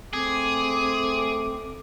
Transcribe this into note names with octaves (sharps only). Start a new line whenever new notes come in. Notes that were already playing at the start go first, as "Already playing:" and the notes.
A3 C4 G#4 D6